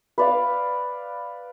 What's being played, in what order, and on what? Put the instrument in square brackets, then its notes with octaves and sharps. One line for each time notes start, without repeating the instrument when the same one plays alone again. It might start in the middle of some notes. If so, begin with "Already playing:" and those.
[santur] B4 D5 F5